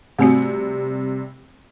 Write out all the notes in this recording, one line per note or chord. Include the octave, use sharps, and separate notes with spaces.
C3 G3 A3 C4 F#4 C#7